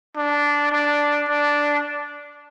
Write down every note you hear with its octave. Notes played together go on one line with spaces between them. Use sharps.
D4
D4
D4